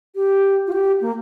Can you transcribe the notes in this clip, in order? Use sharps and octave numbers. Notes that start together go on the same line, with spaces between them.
G4
F4
G4
A#3